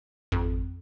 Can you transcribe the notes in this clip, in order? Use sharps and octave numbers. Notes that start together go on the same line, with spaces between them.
G#1 F2